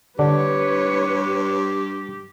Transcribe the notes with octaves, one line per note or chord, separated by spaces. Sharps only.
G2 D3 D4 G4 B4 C#5